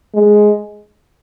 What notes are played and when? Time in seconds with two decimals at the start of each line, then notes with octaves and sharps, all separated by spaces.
0.14 G#3